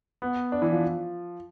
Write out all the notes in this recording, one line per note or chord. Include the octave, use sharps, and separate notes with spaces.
B3
D4
E3
F3